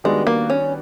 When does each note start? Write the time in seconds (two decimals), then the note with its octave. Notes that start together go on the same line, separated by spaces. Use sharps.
0.04 D#3 G3 G#3 B3 D4 F#4
0.27 A#3
0.50 C#4